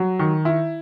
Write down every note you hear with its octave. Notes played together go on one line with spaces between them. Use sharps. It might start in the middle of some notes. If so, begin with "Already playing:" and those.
Already playing: F#3
D#3
E4